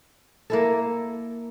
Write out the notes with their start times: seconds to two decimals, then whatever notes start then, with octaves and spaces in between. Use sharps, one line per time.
0.50 A#3 E4 A4